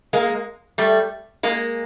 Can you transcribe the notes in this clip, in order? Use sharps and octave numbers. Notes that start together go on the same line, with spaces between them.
G#3 A#3
G3 A3
G#3 A#3